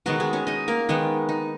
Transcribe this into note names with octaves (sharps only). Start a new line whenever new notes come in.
D#3 F#3 G#3 B3 F#4
G#3 G#4
C#4 C#5
D#4 D#5
A#3 A#4
D#3 G#3 B3
D#4